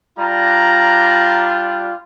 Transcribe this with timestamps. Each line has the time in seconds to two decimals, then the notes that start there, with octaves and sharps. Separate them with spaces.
0.18 G3 D4 F4 A#5